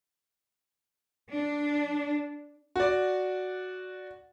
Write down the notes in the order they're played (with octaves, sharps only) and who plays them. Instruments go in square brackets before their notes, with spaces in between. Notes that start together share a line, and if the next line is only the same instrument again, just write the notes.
[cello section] D4
[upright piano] F#4 D5